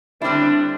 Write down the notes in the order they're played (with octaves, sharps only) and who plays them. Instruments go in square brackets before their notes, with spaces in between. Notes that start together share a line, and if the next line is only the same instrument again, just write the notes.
[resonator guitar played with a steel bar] D3 G3 C4 E4 [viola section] D4